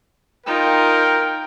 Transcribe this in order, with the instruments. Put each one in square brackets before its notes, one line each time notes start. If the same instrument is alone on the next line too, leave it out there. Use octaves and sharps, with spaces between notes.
[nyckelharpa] D#4 F4 [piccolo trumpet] A#4 [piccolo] G5